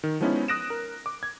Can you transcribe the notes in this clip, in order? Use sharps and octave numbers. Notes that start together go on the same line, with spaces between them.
D#3
F3 G#3 B3 C#4 D#4 E4
D#6 F#6 A#6 D7 E7
A#4
D6
G#6